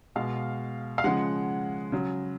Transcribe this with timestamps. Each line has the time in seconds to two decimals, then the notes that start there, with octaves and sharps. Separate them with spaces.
0.16 B2 G#3 F5
0.98 F5
1.04 C#3 F3 G#3 F#5
1.92 C#3 F#3